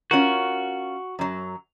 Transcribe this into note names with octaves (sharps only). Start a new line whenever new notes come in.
C#4 F4 F#4 A#4
F#2 F#3